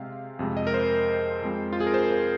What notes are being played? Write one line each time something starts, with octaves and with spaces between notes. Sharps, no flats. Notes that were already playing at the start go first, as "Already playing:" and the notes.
Already playing: C3 G#3 C4 F5
F2 C3 G#3
D#5
A#4
C5
F2 F3 G#3 C4
F4
G#4
A#4
C5
C5